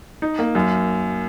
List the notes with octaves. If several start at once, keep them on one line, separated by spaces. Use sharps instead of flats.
D#4
A#3
F#2